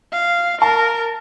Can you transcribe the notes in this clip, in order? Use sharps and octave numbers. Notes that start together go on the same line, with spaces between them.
F5
A#4 A5